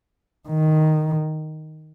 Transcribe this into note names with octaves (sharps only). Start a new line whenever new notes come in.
D#3